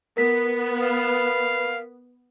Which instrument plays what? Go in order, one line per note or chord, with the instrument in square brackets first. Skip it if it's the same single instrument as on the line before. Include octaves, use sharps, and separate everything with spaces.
[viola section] B3 [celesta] A#4 B6
[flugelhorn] B4 [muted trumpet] F5